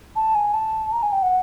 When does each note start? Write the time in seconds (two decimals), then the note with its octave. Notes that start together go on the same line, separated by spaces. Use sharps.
0.16 A5
0.35 G#5
0.54 A5
0.92 A#5
1.03 G#5
1.12 G5
1.22 F#5